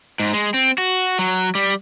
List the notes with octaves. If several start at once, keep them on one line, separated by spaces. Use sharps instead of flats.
G#2
G#3
C4
F#4
F#3
G3